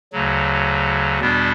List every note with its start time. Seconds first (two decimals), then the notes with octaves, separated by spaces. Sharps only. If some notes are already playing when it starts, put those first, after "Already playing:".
0.13 D2 C#3 F#3
1.20 E2 B2 G3 B3 D4